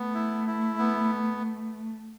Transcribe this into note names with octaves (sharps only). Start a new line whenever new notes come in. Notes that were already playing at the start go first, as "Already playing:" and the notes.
Already playing: A3 B3
E4
E4
B3